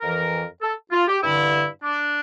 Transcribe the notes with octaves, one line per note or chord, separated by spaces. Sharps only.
F2 E3 A#4
A4
F4
G4
G2 D3 E4
D4